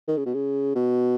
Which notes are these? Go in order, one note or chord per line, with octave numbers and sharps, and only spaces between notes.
D#3
C#3
B2
C#3
B2